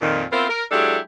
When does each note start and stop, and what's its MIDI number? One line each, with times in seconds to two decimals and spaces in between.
0.01 0.24 41
0.01 0.24 46
0.01 0.24 51
0.32 0.49 59
0.32 0.49 60
0.32 0.49 64
0.32 0.49 65
0.32 0.49 70
0.32 0.49 72
0.49 0.64 70
0.71 0.98 54
0.71 0.98 56
0.71 0.98 62
0.71 0.98 64
0.71 0.98 67
0.71 0.98 69